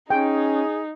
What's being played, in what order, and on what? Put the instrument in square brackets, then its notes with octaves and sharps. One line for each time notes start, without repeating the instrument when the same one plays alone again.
[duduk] C#4 [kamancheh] D#4 [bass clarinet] G#4 [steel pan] G5